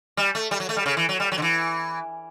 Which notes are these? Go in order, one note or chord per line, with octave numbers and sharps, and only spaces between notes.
G3
A3
G3
F#3
A3
G3
C#3
E3
F#3
G3
F#3
D3
E3